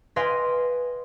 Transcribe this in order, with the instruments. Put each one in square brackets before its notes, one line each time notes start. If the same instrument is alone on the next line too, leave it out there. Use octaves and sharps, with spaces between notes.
[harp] B4 D#5 F5 G5 G#5 C6